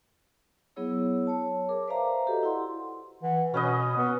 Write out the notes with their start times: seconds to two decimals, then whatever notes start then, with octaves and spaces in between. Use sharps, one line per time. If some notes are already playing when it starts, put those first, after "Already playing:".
0.76 F#3 B3 E4 G#4 C#5 E6
1.27 C#5 A5
1.69 G#4 A#4 D6
1.88 B4 C5 D5 E5 F5 A#5
2.27 F#4 G4 A4 D#5
2.43 E4 F#5 C6
3.23 E3 F#5
3.54 B2 C#4 B4 D#5 B5
3.97 B3 B4